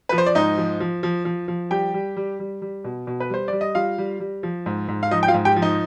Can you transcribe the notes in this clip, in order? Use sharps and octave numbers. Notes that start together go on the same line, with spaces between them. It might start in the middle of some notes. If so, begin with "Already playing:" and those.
F3 B4
C5
D5
G#2 D#4 D#5
F3
F3
F3
F3
F3
G3 G4 G5
G3
G3
G3
G3
B2
B2
B4
G3 C5
G3 D5
D#5
G3 F4 F5
G3
G3
F3
G#2
G#2
F5
F3 D#4 D#5
G5
F4 F5
G#2
G4 G5
F3
D#4 D#5